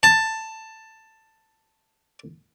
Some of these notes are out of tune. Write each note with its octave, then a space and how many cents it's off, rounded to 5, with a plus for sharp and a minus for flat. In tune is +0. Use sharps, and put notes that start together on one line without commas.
A5 +10